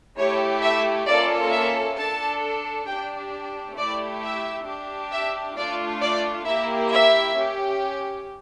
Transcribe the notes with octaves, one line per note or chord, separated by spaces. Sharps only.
A3 E4 G4 C#5
E5
A#3 C#4 F4 A4 D5
E5
D4 A4 A5
D4 G4 G5
A3 E4 G4 D5
E5
D4 G4
E5
A3 D4 F4 D5
D5
A#3 E4 G4 E5
E5
C#4 G4